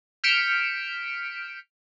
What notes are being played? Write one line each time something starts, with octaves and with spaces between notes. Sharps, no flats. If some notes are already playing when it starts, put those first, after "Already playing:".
F6 G6 B6 C#7 D7 E7